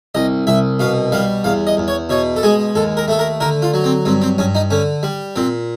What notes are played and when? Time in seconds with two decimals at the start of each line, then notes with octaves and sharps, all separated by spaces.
0.15 C2 D#5
0.47 C2 E5
0.80 B2 F5
1.12 G3 F5
1.44 E2 F5
1.67 D#5
1.77 E2
1.88 C#5
2.10 B2 C#5
2.36 A4
2.43 G#3 G#4
2.75 D#2 A4
2.97 A#4
3.08 A3 A4
3.19 A#4
3.40 D3 A#4
3.62 F4
3.74 F#3
3.84 C4
4.05 G2 C4
4.22 C4
4.38 G2 C#4
4.55 D#4
4.70 D3 C#4
5.03 G3
5.36 A#2 C4